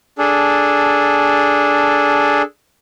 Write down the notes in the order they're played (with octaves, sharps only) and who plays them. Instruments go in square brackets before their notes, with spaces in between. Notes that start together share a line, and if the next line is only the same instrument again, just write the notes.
[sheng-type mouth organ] D4 G#4 A4